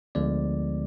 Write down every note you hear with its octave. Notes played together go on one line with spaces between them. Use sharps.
D2 D3 F3 G#3 B3 D5